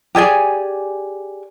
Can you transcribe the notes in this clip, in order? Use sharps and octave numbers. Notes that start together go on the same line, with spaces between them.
G4 G#4 D5 G#5